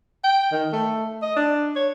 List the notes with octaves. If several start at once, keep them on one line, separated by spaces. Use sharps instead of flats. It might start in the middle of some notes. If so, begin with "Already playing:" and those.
G5
D#3
A3
D#5
D4
C#5